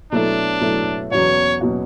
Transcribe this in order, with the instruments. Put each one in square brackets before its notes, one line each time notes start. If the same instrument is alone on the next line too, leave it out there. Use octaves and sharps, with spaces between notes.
[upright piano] B2 F#3 A3 E4 A4 [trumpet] D4
[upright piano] B2 F#3 A3 E4 A4
[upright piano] E2 B2 F#3 C#4 F#4 [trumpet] C#5
[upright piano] B2 F#3 C#4 F#4